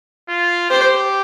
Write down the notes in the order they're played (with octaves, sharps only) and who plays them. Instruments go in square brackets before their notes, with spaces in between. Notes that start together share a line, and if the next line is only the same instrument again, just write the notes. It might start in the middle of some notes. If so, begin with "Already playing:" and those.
[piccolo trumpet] F4
[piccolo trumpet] G4 [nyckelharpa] C5